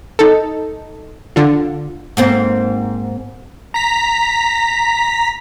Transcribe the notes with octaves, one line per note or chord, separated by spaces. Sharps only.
D#4 A4
D3 F4
G#2 A#3 C4
A#5 B6